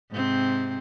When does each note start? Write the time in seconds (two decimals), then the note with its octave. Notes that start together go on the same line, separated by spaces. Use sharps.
0.11 G#2 C3 C4